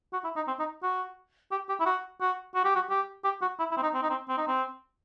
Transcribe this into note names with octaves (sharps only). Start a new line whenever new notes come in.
F#4
E4
D#4
C4
D#4
F#4
G4
G4
E4
F#4
F#4
F#4
G4
F#4
G4
G4
F#4
E4
E4
C4
D#4
C4
D#4
C4
C4
D#4
C4